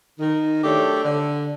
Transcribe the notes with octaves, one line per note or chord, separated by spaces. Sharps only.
D#3
F#3 A3 D4 G4
D3